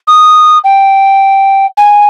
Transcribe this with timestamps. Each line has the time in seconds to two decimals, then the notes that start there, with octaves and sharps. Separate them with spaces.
0.08 D#6
0.64 G5
1.77 G#5